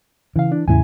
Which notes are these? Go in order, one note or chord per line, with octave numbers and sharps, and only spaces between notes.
C#3 E3 F5
D4
E2 A2 C#3 E4 G#5